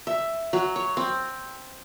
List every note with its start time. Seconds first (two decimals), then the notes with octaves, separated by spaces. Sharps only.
0.07 E5
0.53 F#3
0.76 C#5
0.97 C4